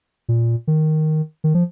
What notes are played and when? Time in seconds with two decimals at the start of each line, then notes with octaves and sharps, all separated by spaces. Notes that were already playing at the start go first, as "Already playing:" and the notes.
0.29 A#2
0.67 D#3
1.44 D#3
1.54 F3